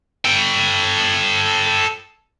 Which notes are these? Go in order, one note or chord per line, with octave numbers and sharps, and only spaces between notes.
A4 G5